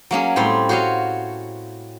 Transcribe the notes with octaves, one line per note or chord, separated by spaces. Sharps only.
F#3 A#3 C#4 G#4
A2 G3 C4 C#5 C6
F#4 C5 C#5 D#5 F5